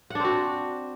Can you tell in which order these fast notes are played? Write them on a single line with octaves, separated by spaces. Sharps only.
F#5 D4 C4 F#4